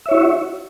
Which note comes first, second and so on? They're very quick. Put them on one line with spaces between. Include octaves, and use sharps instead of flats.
E5 C#5 E4 F#4